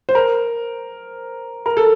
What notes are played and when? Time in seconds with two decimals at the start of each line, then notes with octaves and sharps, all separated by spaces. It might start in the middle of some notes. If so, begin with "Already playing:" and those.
0.09 C5
0.15 A#4
1.66 A#4
1.77 A4